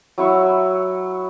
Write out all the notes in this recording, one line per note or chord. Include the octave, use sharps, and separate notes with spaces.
F#3 E4 C#6